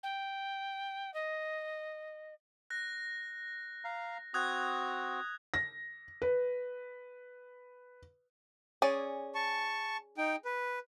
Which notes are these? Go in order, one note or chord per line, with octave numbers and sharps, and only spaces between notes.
G5
D#5
F#6 A#6
F5 A#5
C4 F#4 D#6 F#6 G#6
A#6
B4
C#4 G#4 D5
A5 C#6
D#4 G5
B4